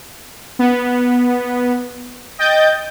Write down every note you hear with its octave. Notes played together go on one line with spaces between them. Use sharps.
B3
D#5 G5 G6 A6